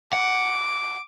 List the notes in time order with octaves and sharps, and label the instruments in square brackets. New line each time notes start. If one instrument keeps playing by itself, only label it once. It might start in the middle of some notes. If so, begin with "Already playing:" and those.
[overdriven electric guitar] F#5 [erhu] D6